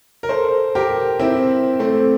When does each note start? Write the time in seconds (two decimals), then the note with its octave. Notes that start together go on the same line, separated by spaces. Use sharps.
0.23 A#4
0.29 A4 C5
0.75 G4 A#4
1.19 C4 E4
1.79 A3 C4